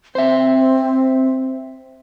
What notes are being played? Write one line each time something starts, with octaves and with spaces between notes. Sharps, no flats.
C4 C5 E5